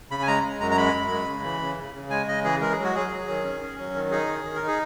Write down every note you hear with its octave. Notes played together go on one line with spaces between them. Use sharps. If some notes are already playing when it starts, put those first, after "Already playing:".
C#3 B5
G#5
G#3 A#5
G#3
F#2 A#5
A#5
G#3 B5
F#2
G#3
C#3
E3
C#3
C#3
C#3
G#3 G#5
C#3 D#5
E3 G#4
G#3 A#4
G#4
F#3
F#4
F#3 G#4
F#3
D#3
C#4
C#4
F#3
D#3
D#4 G#4
D#3
D#3
A#4
D#4
G#4